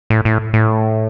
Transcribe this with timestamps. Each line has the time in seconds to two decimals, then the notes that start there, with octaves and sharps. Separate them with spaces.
0.10 A2
0.25 A2
0.54 A2